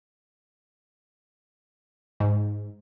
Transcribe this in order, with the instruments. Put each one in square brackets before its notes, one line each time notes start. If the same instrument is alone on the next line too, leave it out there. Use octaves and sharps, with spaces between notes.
[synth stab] G#2